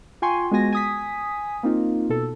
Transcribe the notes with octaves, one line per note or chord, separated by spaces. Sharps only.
F4 G5 G#5 C6 C#6
G#3 B3 F#4 G#5 A#6
G#5 D#6 B6
A#3 C4 D#4 F4
B2 A4